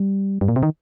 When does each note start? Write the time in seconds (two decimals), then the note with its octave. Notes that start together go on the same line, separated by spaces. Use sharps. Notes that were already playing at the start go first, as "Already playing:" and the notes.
Already playing: G3
0.41 G2
0.48 A#2
0.56 C3
0.63 D#3